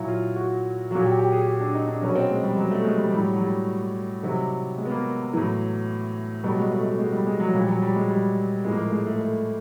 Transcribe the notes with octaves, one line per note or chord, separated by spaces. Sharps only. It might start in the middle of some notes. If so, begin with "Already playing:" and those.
Already playing: A#2 F#3 E4
F4
F#4
A#2 F#3 F#4
G4
G4
G#4
G4
D4
D#4
D4
B2 F#3 C#4
C4
G#3
G3
F#3
A3
G#3
G3
A2 F#3 G3
F#3
G3
C3 D#3 F#3
G#3
B3
A#3
A2 E3 F#3
B2 F#3 G3
G#3
A3
A3
G#3
G3
G#3
F#3
A#2 F3 G3
F#3
G3
G#3
G3
A2 F3 G#3
A#3
A3
G#3
A3
A3